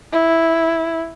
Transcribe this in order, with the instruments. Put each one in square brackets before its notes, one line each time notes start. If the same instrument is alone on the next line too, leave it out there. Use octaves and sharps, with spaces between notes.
[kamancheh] E4